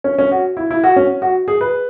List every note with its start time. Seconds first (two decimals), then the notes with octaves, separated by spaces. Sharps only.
0.04 C#4
0.18 C#4
0.32 F#4
0.57 E4
0.71 E4
0.84 F#4
0.96 C#4
1.22 F#4
1.48 G#4
1.61 B4